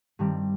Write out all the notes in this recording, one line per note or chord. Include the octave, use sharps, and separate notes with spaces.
G2 D#3 G3 C4